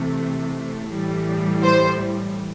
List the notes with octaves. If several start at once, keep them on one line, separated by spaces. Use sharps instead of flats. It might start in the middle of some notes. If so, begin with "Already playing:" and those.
Already playing: C3 E3 A3
A2 E3 G3
C5